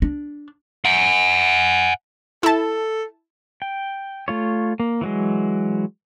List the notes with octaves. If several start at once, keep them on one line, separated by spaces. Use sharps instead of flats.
D4
F#5 G#5
E4 A4 A5
G5
A3 F4 C#5
A#3
E3 F#3 G#3